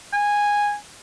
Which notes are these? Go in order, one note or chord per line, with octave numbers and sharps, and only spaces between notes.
G#5